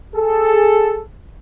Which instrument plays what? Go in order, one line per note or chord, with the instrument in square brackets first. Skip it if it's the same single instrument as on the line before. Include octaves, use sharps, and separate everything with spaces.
[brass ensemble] G#4 A4